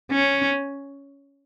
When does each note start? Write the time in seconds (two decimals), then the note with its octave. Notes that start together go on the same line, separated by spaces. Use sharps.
0.12 C#4